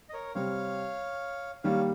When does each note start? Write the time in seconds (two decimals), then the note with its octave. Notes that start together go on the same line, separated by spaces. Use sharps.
0.09 D#5
0.14 A#4 C#5
0.35 C3 G3 C4 C#5 F5
1.63 D#3 G3 A#3 C#5 F5